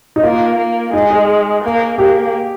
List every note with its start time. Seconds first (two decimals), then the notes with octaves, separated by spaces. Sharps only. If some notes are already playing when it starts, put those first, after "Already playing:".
0.16 D#4
0.23 A#3 F4
0.58 A#3
0.93 G#3 D#4
1.11 G#4
1.64 A#3
1.98 A#3 G4